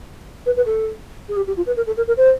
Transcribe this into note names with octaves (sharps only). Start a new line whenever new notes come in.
B4
B4
A4
G#4
G4
G4
F4
B4
A#4
A4
A#4
A#4
C5